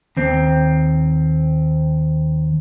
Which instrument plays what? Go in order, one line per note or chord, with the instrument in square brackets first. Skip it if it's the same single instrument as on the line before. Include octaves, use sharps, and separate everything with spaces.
[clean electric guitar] D#2 C4